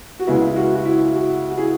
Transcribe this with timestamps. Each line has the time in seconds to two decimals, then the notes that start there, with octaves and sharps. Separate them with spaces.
0.19 F#4
0.27 C#2 C#3 G#3 B3 E4
0.46 E4
0.56 F#4
0.75 F#4
0.85 E4
1.14 F#4
1.50 F#4
1.58 E4 G#4